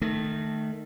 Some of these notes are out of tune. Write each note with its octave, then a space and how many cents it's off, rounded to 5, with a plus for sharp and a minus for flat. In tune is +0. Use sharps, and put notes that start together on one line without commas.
D#3 -20 A3 +0